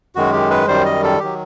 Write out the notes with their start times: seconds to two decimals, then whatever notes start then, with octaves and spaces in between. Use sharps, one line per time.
0.15 F#2 D#3 G#3 F#4
0.33 G4
0.50 B4
0.68 F#2 D#3 G3 C5
0.86 D#5
1.04 A4
1.20 D#3 F#3 G4